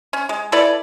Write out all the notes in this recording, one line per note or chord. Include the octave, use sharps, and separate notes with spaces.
C#4
G#3
E4 A4 B4 D5